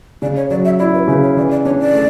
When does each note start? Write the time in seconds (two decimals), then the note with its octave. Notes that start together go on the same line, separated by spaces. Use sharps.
0.22 C#3 D5
0.36 C#5
0.50 F#3 D5
0.65 E5
0.79 E4 D5
0.94 B4
1.08 C#3 B4
1.23 C#5
1.37 E3 D5
1.51 D5
1.65 D4 C#5
1.80 D5
1.94 A3